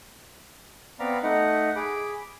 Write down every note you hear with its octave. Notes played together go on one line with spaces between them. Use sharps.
B3 C4 D5 F5 A#5 B5
A3 D#4 D#5 F#5
G#4 B5 D6